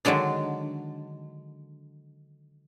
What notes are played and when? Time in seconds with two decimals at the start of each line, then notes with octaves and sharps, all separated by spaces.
0.05 D3 D#3 F#3 G#3 D4